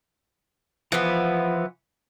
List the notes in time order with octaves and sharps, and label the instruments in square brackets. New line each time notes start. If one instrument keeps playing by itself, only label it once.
[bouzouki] E3 B3 [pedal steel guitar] F3